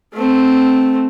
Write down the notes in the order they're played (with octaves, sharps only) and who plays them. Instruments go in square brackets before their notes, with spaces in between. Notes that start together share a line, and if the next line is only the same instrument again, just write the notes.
[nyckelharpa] A3 C4